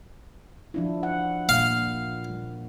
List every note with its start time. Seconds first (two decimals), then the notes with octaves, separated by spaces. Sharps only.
0.74 F3 D4 E4
1.03 F#5
1.49 A#2 F5